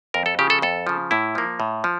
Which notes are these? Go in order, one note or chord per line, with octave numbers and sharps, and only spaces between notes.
F2 A#4
A4
C#3 F3 G4
A4
F2 A4
C#3 F3
A2 E4
F3 A#3
A2
F3